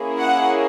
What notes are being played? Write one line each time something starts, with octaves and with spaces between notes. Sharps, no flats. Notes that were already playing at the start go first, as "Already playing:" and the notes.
Already playing: A#3 C#4 E4 G#4
F#5